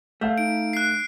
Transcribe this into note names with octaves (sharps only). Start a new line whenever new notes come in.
A3 F5 E6 G6
D#4 D7
F#6 C7